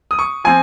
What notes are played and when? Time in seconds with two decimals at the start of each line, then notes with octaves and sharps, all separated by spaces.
0.11 D#6
0.19 C#6
0.44 F3 C4 G#5